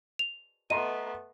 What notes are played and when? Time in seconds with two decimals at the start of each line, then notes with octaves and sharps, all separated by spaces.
0.19 F7
0.70 A3 B3 D#5 A#5 C6 D#7